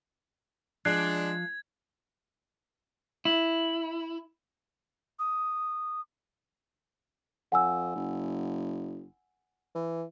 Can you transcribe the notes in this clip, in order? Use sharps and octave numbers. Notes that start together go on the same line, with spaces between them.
F3 G#3 D4 F#6 G#6 C7
E4
D#6
F2 F#5 G#5 E6
F#1
E3